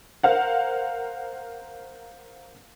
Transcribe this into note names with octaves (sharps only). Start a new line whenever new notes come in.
A#4 C5 F5 F#5